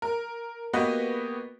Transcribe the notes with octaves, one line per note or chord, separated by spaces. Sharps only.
A#4
A#3 B3 F#4 G4 B4 D#5